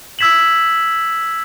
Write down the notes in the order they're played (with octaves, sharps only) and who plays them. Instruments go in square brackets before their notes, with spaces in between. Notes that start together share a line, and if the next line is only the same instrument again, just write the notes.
[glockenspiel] E6 G#6 B6 E7 F#7